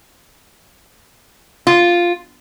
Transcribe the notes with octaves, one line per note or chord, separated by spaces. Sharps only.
F4